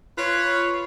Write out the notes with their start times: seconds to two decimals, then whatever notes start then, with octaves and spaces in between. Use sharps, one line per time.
0.18 F4 B4 C#5